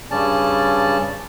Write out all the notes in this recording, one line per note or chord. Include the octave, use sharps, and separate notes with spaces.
G2 C#3 C#4 D5 A5